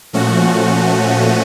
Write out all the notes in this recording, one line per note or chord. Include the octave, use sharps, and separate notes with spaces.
A#2 F3 A3 C#4 F#4